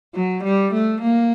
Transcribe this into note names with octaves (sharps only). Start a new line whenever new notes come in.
F#3
G3
A3
A#3